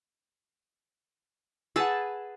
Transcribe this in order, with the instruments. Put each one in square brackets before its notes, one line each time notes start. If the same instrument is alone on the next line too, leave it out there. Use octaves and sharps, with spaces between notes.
[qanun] G#4 B4 A5 [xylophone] F#5 E6